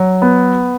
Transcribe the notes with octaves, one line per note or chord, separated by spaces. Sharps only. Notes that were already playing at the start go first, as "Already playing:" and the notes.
Already playing: F#3
B3